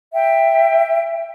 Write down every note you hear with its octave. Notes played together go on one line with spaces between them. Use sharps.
E5 G5